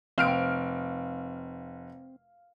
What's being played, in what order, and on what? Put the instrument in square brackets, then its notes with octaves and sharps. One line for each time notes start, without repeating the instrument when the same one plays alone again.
[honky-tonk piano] F1 F6 D7 [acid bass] C4 [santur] F5